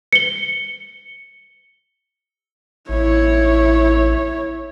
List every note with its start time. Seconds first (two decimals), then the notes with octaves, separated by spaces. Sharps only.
0.13 C#7 G7
2.89 A1 E4 C#5